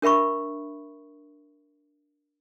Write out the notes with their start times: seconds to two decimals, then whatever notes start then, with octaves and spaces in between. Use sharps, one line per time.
0.02 D4 A#4 E5 B5 C#6